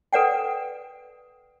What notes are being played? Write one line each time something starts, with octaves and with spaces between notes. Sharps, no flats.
A4 B4 D5 F#5 G5